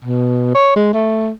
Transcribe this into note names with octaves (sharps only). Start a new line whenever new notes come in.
B2
C#5
G#3
A3